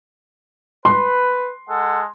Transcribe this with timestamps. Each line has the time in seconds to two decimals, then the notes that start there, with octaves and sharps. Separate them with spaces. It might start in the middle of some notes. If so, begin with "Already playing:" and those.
0.85 B4 C6
1.68 G#3 A4 F#5